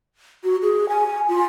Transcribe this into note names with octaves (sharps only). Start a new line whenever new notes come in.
F#4
G#4
G#5
F4